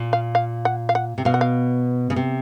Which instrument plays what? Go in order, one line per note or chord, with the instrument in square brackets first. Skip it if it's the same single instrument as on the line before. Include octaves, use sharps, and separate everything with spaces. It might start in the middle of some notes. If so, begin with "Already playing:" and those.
Already playing: [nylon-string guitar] A#2
[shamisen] F5
F5
F#5
F5
F#5
[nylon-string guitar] C3
[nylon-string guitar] B2 [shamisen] F5
[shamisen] F#5
F5
[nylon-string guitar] C#3
C3